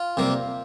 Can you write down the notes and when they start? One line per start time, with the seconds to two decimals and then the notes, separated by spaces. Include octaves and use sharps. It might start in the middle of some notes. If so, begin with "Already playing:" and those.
Already playing: F4
0.17 C3 G3 A#3